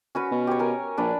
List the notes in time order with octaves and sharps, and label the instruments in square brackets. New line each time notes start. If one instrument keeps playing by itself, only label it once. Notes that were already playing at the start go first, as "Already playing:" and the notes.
[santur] C#4 F#4 B4
[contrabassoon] B2
[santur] G4 C#5
A#4 G#5
[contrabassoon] A#1 [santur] D4 B4 D5